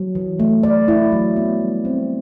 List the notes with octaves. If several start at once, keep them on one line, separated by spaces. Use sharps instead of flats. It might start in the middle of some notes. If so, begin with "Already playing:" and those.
Already playing: F#3
E3
A3
D5
E4
F#3
B3
G3
C4